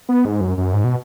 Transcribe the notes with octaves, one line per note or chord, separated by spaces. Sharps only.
B3
G#2
F#2
F#2
G#2
B2